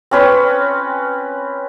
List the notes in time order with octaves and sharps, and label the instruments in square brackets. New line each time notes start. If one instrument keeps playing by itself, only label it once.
[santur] C4 C#4 B4